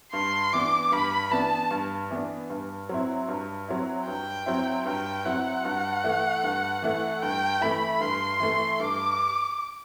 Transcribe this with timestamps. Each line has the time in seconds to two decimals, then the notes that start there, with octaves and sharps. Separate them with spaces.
0.13 G2 C6
0.53 E3 B3 D4 D6
0.92 G2 B5
1.31 E3 B3 D4 A5
1.71 G2
2.11 E3 B3 D4
2.50 G2
2.89 F#3 C4 E4
3.28 G2
3.68 F#3 C4 E4
4.07 G2 G5
4.46 F#3 C4 E4
4.86 G2 G5
5.25 F#3 C4 E4 F#5
5.65 G2
6.04 E3 A3 E4
6.43 G2
6.82 E3 A3 E4
7.22 G2 G5
7.61 E3 A3 E4 B5
8.00 G2 C6
8.40 E3 A3 E4
8.80 G2 D6